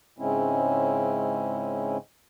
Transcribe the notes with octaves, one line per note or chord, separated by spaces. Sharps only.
G#2 C#3 G#3 C4 C#4 E4